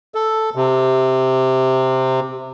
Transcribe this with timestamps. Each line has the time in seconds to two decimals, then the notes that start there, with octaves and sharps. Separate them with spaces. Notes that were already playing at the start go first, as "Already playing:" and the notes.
0.15 A4
0.55 C3